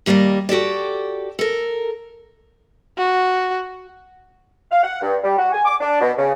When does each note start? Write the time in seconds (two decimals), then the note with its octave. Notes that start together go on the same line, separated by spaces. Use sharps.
0.06 D#2 G3 A#3 D5 D#5
0.49 F#4 G4 A4 D5
1.39 A4 A#4
2.98 F#4
4.71 F5
4.83 F#5
5.02 G2
5.23 G3
5.38 F#4
5.52 G#5
5.65 D6
5.81 D4
6.01 B2
6.18 C#3